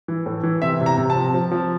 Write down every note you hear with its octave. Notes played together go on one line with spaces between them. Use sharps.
E3
A2
E3
C3 E5
C3
A#5
C3
A5
F3
F3
F3